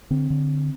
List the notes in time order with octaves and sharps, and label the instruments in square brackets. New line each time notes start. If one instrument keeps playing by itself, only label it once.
[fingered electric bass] D3 C4
D3